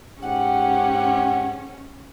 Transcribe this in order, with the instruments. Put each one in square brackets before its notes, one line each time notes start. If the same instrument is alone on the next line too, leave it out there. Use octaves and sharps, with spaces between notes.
[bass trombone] G#2 [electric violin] C#4 [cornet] G4 [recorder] F#5